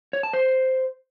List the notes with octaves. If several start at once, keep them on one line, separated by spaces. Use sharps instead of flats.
C#5
A5
C5